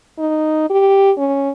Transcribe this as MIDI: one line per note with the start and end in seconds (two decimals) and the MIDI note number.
0.18 0.68 63
0.70 1.11 67
1.18 1.51 61